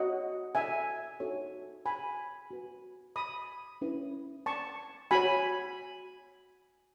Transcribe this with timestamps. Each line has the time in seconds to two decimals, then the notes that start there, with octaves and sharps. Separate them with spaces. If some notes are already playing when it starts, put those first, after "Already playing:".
Already playing: F#4 C#5 D#5 F#5
0.55 E5 G#5
1.20 D#4 F#4 A4 C#5
1.86 G#5 B5
2.51 F#4 B4
3.16 B5 D#6
3.81 C#4 E4 B4
4.46 A5 C#6
5.11 F#4 C#5 G#5 B5